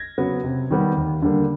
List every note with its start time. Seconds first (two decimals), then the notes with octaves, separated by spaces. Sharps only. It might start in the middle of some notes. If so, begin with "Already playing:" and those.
Already playing: G#6 A#6
0.18 C#3 F#3 B3
0.44 C3
0.70 D#3 G3 B3
0.96 D#2
1.22 D3 G3 A#3